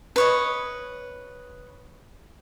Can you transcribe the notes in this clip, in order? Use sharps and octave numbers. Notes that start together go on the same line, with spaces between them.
B4 C#5 D#5